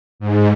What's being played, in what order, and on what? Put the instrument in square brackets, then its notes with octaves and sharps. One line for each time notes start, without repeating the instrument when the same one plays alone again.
[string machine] G#2